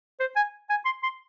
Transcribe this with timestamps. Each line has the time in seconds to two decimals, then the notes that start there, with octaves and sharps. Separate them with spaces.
0.20 C5
0.36 G#5
0.70 G#5
0.85 C6
1.03 C6